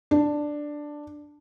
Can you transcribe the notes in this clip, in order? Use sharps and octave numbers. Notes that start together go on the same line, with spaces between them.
D4